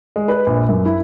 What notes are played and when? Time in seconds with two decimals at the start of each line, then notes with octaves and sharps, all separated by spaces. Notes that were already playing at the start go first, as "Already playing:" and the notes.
0.16 G#3
0.28 B4
0.46 A#1
0.69 F#2
0.85 E4